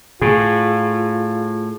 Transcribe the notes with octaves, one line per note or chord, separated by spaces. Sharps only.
A2 F4 G#4